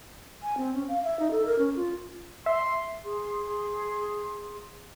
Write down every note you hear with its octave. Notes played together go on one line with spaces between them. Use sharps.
G#5
C4
C#4
F5
E5
D#4
A4
A#4
C#4
F4
E5 C6
G#4 C6